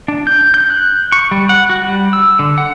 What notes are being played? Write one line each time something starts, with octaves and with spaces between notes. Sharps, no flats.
D4
G6
G6
F#6
C#6
G3
F#5
F#4
G3
E6
D3
F#5